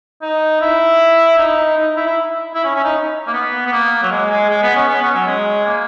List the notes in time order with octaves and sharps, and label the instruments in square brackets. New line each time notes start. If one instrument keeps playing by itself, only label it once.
[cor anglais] D#4
E4
D#4
D#4
E4
E4
E4
C#4
C#4
D#4
A#3
B3
B3
A#3
F#3
G#3
G#3
G#3
B3
C#4
B3
C#4
F#3
G#3
A#3